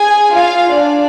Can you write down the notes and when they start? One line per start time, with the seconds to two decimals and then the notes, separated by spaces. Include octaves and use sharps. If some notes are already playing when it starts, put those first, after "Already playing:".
Already playing: G#4 G#5
0.33 F4 F5
0.73 D4 D5